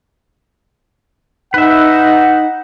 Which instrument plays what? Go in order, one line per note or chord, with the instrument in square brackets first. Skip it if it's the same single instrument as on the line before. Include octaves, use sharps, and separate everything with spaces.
[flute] D#4 [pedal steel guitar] B4 E5 [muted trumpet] F#5